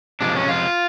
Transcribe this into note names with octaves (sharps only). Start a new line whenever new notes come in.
C3 F3 G#3 D4
C#4
F4